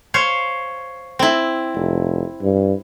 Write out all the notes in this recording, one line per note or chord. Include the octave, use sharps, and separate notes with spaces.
C5 C#5 F5
C4 E4
F1
G2